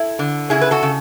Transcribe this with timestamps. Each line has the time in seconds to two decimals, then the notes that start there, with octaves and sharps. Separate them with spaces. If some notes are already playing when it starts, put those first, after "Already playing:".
Already playing: E4 A4
0.19 D3
0.50 C#3 E4 G#4
0.61 B4
0.71 F#4 A4
0.83 C#3